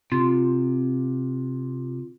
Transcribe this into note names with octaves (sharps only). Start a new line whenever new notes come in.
C3 F4